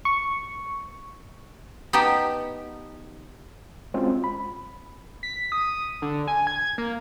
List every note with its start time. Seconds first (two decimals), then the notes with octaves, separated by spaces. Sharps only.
0.05 C#6
1.93 B3 D#4 G4 G5 A5
3.94 G#3 C4 C#4 F4 F#4
4.24 B5
5.23 B6
5.52 D#6
6.02 D3
6.28 G#5
6.47 G#6
6.78 A#3